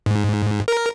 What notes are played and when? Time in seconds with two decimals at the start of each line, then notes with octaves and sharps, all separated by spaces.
0.06 G#2
0.68 A#4